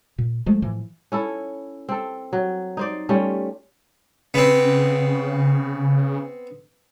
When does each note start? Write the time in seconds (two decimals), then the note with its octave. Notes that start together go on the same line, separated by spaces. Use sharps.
0.18 A#2
0.46 F3 G#3 A3
0.62 A2 E3 F3
1.12 C#4 E4 A4
1.89 C4 A4
2.33 F#3
2.77 D#4 C5 D5
3.09 G3 A3 C#4 F4
4.34 C#3 B3 C4